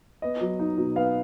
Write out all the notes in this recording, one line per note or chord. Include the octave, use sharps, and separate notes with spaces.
B3 D#5
F#3
D#4
B2
B3 F5